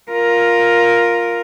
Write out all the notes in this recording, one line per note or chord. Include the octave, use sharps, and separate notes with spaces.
F4 A#4